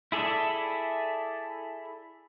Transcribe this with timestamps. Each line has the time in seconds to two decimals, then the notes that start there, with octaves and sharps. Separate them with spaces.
0.12 E4 G#4 A4 D5 E5